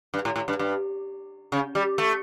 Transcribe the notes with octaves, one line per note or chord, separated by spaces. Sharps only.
G2
A2
A2
G2
G2
C#3
G3
A3